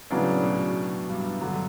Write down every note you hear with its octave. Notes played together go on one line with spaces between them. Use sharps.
A2 C#3 F#3 B3 D4 F#4
B2
G2
D3 F#3